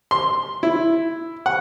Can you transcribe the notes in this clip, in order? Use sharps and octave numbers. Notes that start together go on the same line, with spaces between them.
C6
E4
F#5